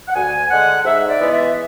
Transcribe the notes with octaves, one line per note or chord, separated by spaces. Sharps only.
F#5
D2 G#5
D3 G#3 F#5
G#2 E5
D5
E3 G#3 B3
E5